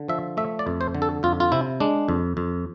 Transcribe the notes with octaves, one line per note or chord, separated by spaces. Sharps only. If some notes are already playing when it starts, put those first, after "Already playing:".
Already playing: D3
F3 E5
A3 E5
D5
F2
C5
D3
A4
F2 F4
F4
C3 E4
G#3 D4
F2
F2